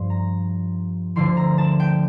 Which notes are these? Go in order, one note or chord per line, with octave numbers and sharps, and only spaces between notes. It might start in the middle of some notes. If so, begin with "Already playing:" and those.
Already playing: G2 F3 C6
A#5
D2 D3 F3 C6
A#5
A5
G5